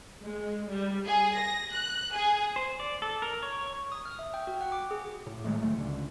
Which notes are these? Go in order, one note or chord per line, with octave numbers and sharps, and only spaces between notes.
G#3
G3
G#4
A#6
F#6
G#4
C5
D5
A4
A#4
C#5
D#6
F6
E5
G5
F#4
F#5
D6
G#4
A2
D#3 F#3 G#3 A3
G1 D2 A3
C#2 D3